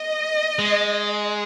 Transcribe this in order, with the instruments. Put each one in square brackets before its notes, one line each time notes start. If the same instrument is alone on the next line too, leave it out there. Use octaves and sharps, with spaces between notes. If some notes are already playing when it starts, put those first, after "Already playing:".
Already playing: [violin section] D#5
[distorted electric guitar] G#3